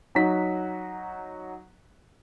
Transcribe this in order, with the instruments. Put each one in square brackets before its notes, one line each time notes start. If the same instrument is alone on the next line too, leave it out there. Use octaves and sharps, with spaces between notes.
[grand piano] F#3 D#4 F#4 B6